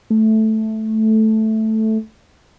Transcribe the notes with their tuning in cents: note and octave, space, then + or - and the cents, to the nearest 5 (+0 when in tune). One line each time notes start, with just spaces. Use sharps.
A3 -5